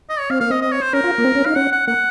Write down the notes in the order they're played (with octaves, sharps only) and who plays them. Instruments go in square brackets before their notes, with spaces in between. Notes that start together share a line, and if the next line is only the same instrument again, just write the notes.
[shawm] D#5
C#5
[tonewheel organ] C4 [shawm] F5
[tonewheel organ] A#3 [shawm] F5
[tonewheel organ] C4 [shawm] D#5
[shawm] D#5
C#5
C5
[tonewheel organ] C#4 [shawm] A#4
[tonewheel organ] F4
A#3
C4
C#4
[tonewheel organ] D#4 [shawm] F5
[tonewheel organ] C#4 [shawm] F#5
[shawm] F#5
[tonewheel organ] A#3 [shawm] F#5